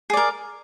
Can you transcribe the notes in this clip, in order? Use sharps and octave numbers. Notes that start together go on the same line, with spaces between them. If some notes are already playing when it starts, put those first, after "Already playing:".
G#4 A#4 D5